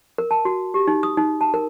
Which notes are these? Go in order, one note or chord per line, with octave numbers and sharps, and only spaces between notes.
A#4
A5
F#4
G4
D#4
D#6
D#4
A5
A#4